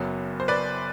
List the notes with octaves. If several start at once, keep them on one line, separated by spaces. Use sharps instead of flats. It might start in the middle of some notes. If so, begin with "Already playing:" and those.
Already playing: F#1 F#2 F#3 B3
C5
B4 D5